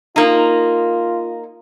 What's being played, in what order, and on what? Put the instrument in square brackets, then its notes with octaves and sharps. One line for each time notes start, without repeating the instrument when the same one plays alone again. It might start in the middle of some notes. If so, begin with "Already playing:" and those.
[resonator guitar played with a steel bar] A#3 D#4 [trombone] F4